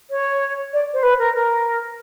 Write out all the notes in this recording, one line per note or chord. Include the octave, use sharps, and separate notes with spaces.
C#5
D5
C5
B4
A#4
A#4